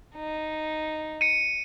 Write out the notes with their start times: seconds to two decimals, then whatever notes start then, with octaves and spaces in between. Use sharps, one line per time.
0.15 D#4
1.21 C#7 D#7